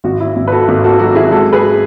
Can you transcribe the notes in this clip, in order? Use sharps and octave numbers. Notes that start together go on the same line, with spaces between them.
G#1 F#4
E4
G#1
B4
F#4 A4
G#1
F#4 A4
F#3 F#4
E4 G#4
G#3 F#4 A4
G#4 B4